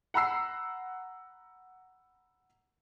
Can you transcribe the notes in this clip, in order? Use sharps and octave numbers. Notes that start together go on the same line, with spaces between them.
F#5 A#5 B5 E6 C7